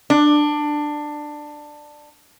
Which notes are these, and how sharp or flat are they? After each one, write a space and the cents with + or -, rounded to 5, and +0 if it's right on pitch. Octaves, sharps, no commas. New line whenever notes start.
D4 +15